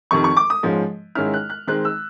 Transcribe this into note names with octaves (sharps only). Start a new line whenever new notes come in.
F2 C3 D#3 C#6
C#6
D6
D#6
G#2 F3 G#3 C#4
G#2 D#3 G#3 C#4 E4 F6
F#6
F#6
D#3 G#3 C4 F#6
E6